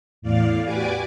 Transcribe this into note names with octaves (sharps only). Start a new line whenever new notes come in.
E2 A2 D5 F5
F#4 G4 B4 D5 G#5 D6